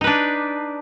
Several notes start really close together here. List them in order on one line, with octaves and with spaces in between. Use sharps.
D#4 B4 D4